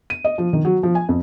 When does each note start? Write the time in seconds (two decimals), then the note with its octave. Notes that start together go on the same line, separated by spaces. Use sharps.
0.10 D#7
0.25 D#5
0.38 F3
0.53 D#3
0.65 F#3
0.83 F3
0.95 G#5
1.09 F2